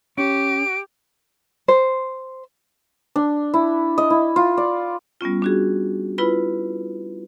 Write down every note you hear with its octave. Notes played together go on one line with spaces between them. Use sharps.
C#4 G4 D7
C5
D4
E4
D#5
E4
F4
D5
G3 B3 C#4 F4
D4 F#4 G#4
E4 F4 B4 B5